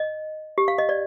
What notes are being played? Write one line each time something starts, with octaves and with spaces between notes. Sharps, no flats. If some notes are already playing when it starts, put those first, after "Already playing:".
Already playing: D#5
G4
F5
D#5
D5